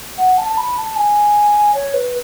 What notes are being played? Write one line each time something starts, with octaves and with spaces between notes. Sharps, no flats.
F#5
A5
A5
B5
A5
G#5
C#5
B4